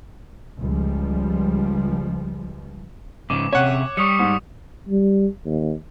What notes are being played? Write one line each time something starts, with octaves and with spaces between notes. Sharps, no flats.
C#2 F3 G3
G#2 C#3 D6
C3 C#4 C#5 F#5
G3 C#6 D#6 C#7
G#2
G3
D#2